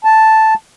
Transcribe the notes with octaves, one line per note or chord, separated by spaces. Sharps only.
A5